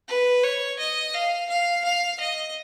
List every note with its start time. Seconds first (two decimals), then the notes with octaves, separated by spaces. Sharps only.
0.08 B4
0.43 C#5
0.79 D#5
1.14 F5
1.49 F5
1.85 F5
2.20 D#5